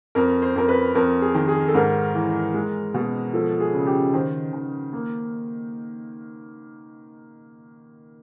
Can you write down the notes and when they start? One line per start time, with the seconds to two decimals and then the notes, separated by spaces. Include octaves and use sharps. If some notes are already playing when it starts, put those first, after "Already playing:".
0.15 F2 A#4
0.42 C5
0.56 F2 A#4
0.69 B4
0.95 F2 A#4
1.22 G#4
1.34 D#3
1.48 G#4
1.68 A4
1.74 G#2 A#4
2.14 E3
2.54 G#3
2.94 B2
3.33 F3 A4
3.60 G#4
3.74 C#3
3.87 G4
4.13 D#3 C5
4.53 D#3
4.93 A#3